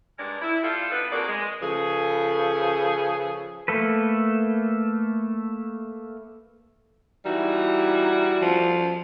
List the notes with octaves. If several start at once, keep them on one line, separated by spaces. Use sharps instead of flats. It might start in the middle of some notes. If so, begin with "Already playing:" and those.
G2 G#3 D4 A#4 D5
E4
G3 F4 A4
B3 D4 D#4 A4 B4
F2 A#3 F#4 G#4 A#4 D5
G#3
C#3 F3 G#4 A4 B4
A3 A#3 A4 B4
E3 G3 D#4 F#4
F3